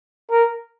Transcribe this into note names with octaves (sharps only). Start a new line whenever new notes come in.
A#4